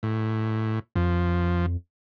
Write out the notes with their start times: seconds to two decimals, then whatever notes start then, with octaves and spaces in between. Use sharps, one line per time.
0.03 A2
0.96 F2 F3